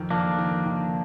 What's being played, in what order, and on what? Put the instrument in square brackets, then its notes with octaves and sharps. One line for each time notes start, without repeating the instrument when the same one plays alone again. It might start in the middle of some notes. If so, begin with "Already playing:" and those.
Already playing: [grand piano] F2 D#3
[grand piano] F2 [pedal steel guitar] A#3 D4
[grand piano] D#3
D#3